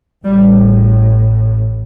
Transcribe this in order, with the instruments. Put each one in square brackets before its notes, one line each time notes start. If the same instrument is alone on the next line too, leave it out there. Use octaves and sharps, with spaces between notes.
[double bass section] A1 A2 G3